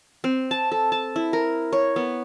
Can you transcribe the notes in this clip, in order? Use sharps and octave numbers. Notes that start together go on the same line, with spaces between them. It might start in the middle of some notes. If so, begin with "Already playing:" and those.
C4
A5
A4
A5
E4
A#4
C#5
B3